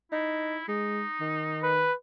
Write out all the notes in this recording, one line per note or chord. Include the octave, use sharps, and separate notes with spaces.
D#4 E4
G#3 D#4
D#3
B4